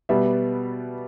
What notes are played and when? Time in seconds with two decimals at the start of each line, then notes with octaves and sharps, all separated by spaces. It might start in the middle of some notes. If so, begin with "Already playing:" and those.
0.09 B2 G3 B3 E5